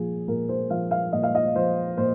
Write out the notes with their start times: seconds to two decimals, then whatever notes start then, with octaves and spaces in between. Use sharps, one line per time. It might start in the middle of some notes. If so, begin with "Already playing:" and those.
Already playing: A#2 F3 G#4
0.28 A#2 A#4
0.49 C5
0.70 F3 F5
0.91 F5
1.13 A#2 D#5
1.23 F5
1.35 D#5
1.55 F3 C5
1.97 A#2 C5